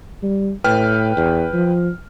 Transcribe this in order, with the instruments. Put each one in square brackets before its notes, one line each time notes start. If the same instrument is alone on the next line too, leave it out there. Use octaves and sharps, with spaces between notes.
[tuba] G3
[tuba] A2 [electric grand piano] B4 G5 F6
[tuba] E2
F3